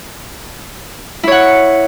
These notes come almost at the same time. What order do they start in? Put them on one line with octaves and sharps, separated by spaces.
E4 C#5 F#5